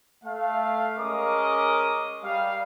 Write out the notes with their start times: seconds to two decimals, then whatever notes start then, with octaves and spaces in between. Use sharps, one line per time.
0.24 A3 F5
0.97 G#3 C#4 A#4 D#5 D6 D#6
2.23 G3 F5